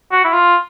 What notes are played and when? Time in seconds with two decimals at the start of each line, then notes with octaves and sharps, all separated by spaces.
0.12 F#4
0.24 E4
0.34 F4